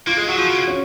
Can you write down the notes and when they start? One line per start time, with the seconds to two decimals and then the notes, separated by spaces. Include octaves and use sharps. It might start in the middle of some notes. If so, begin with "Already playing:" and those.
0.07 A#3 F4
0.17 G#3 G#4
0.27 F#3 F#4
0.37 F3 F4
0.47 C#3
0.67 C#4